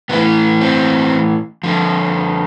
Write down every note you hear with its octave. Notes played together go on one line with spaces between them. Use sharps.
A2 E3 B3
C4
D3 F3